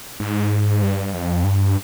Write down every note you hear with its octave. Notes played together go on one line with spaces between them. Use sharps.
G#2
G2
F2
G2